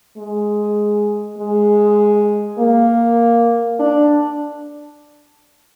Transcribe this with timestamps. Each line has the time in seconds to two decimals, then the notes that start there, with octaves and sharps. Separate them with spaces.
0.18 G#3
1.39 G#3
2.59 A#3
3.79 D4